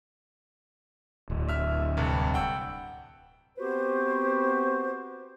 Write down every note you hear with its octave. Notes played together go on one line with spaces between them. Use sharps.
D1
E5 F6
C2 G2 A4
F#5 G5 E6
B3 C4 F#4 G4 B4 C5